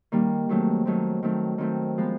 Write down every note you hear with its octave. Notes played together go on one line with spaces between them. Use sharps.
D#3 G3 A#3
D#3 F#3 A3 C4
D#3 F#3 A3 C4
D#3 F#3 A3 C4
D#3 F#3 A3 C4
F3 G#3 B3